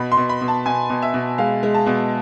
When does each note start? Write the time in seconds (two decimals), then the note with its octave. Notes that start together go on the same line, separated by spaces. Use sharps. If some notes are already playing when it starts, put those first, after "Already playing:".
Already playing: B2 B5
0.12 C6
0.17 B2
0.29 B5
0.41 B2
0.48 A5
0.66 B2 G#5
0.90 B2
1.02 E5
1.14 B2
1.38 G#3 F5
1.63 G#3
1.74 A5
1.87 B2